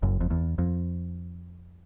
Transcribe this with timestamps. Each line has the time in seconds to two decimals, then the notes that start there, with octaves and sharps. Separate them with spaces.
0.03 F#1 F#2
0.21 F2
0.31 E2
0.58 F2